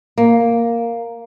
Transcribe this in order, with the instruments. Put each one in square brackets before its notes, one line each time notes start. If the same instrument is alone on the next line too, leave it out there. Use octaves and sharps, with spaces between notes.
[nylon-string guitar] A#3